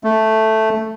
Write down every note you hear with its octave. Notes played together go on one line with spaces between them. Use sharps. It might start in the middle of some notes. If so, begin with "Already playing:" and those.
A3